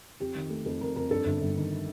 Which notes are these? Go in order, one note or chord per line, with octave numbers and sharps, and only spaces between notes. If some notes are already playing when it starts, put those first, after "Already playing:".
F2 G4
D#3
A3
F2 A4
F2 A#4
F2 A#4
G2 A4
G1
G1
D#3